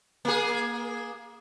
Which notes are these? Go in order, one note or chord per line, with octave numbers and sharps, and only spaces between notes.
A#3 G#4